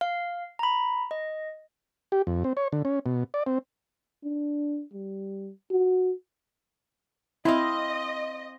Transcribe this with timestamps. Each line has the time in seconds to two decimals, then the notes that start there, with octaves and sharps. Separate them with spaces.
0.01 F5
0.59 A#5 B5
1.11 D#5
2.12 G4
2.27 F2
2.44 C4
2.57 C#5
2.72 D3
2.85 C#4
3.06 B2
3.34 D5
3.46 C4
4.24 D4
4.93 G3
5.71 F#4
7.45 C4 E4 D#5 F5